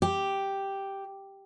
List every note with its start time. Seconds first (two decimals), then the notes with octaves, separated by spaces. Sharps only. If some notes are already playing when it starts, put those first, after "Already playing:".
0.02 G4